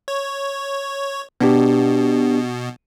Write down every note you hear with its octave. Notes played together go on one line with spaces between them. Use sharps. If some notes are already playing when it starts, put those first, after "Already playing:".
C#5
B2 B3 D4 G4